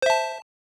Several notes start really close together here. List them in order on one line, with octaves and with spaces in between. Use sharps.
C5 E5 A5